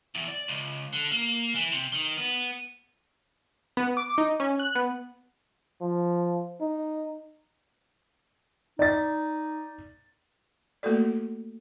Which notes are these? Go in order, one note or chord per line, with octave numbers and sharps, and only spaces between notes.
E2
D5
C#2
D3
A#3
E3
C3
D#3
B3
B3
D6
D#4
C#4
F#6
B3
F3
D#4
D#4 D5 A6
A3 A#3 F#4 A4 D5